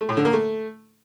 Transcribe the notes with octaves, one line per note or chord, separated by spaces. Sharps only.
A3
A2
D3
A#3
A3